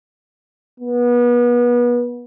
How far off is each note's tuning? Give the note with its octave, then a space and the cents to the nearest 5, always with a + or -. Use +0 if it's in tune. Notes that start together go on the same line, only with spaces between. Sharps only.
B3 -30